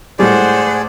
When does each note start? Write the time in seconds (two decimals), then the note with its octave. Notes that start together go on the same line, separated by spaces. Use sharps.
0.19 A2 G3 G#3 G#4 C5 D5 F#5